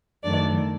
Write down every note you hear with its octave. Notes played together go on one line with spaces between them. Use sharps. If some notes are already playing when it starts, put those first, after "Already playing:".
F#2 D#3 A3 D4 D5